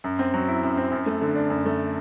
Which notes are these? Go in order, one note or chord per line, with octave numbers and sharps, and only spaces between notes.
F#2
C4
F#3
E4
F#2
C4
F#2
A3
D3
D4
F#2
A3